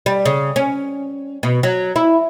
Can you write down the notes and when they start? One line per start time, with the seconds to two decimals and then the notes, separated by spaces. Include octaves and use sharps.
0.06 G3
0.25 C#3
0.56 C#4
1.43 B2
1.63 F#3
1.96 E4